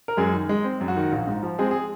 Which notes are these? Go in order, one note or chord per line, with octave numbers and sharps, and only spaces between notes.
A#4
F#2 G#3 G#4
D#3
G#3
C4
F#2
F#4
D#3
A#1
G#2
F3
G#3 C4 G#4
G#4